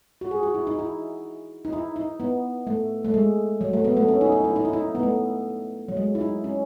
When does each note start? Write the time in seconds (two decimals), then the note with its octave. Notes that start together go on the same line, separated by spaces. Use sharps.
0.21 F#4
0.31 G#4
0.43 F#4
0.54 E4
0.67 D#4
0.79 E4
1.65 D#4
1.73 E4
1.96 D#4
2.20 B3
2.67 A3
3.05 A3
3.14 G#3
3.61 F#3
3.73 A3
3.84 B3
3.97 A3
4.08 C#4
4.21 D#4
4.32 D#4
4.44 E4
4.56 D#4
4.65 E4
4.73 D#4
4.95 B3
5.03 A3
5.88 F#3
5.97 G#3
6.15 E4
6.21 D#4
6.44 C#4